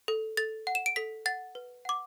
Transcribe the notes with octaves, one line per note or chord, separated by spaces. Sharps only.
A4
A4 A6
F#5
E7
D7
A4 B6
F#5 A6
B4
F#5 D6